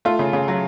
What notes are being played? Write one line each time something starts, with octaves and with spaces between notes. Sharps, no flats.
A3 F4
C#3
C#3
F#3